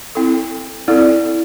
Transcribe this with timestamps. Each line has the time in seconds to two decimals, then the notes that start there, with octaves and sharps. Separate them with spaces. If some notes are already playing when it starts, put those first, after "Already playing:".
0.15 C4 E4 A4
0.88 C4 E4 A4 D5